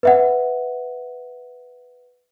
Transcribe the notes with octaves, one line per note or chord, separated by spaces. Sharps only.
B4 E5 F#5